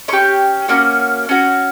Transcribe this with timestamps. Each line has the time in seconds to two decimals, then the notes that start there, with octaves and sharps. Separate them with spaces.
0.08 C#4 G4 C#6
0.68 A#3 C#4 F#4
1.29 C#4 F#4